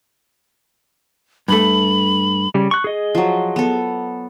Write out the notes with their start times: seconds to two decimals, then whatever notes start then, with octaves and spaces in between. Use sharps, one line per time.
1.48 G2 A3 B5
2.54 C#3 G3
2.71 C#6 F#6
2.84 G#4 D#5
3.15 F3 F#3
3.56 B3 A4